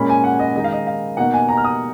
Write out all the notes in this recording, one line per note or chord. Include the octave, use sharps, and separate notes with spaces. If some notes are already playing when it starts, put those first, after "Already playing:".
Already playing: A#2 G#3 C#4 B5
G#5
F#5
D#5
D#3 G#3 D#4 D#5
F5
D#5
F5
B2 A#3 D#4 F#5
G#5
A#5
F6
D#6